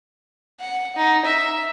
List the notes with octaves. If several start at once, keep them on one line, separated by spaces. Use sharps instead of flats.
F#5
D#4
E5